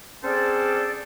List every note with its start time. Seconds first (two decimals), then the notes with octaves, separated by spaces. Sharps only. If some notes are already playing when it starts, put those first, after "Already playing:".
0.24 C4 C#4 G#4 A4 C5 D5